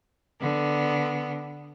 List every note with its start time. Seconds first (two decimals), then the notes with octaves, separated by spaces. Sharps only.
0.40 D3 B3